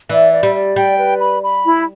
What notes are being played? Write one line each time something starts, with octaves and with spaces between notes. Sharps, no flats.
E3 D5
D5
G3
D5
G3 G5
B4
B5
B5
E4